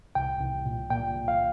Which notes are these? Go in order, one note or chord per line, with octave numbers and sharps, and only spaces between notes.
C2 G5
C2
A#2
A#2 G5
A#2
F5